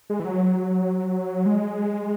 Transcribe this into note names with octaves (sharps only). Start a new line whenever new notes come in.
G#3
E3
F#3
G#3